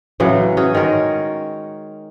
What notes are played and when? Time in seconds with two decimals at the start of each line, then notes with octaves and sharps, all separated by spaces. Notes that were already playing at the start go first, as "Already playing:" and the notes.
0.20 A2 C#3 E3 F#3
0.57 C#4 F#4 G#4
0.75 D#3 G#3 A#4 C#5